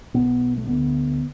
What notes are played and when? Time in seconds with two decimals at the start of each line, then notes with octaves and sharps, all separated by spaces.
0.14 B1 B2 B3
0.57 A3
0.67 D2 D3 B3